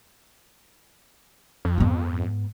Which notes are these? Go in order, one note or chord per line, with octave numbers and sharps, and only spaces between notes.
F2
G#2 B3